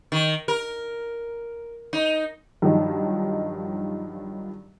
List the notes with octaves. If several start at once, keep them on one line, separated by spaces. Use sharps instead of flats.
D#3
A#4
D#4
G2 D#3 F3 F#3 D#4